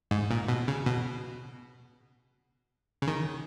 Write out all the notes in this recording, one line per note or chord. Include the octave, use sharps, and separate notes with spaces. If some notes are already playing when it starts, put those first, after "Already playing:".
G#2
A#2
B2
C#3
B2
C#3
D#3